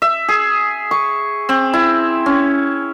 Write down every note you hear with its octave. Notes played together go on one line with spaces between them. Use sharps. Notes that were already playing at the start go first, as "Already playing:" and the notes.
E5
G#4
C#6
C4
E4
C#4